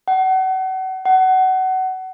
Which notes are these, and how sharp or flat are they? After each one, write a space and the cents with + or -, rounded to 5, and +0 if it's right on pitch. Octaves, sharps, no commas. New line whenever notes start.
F#5 +35
F#5 +25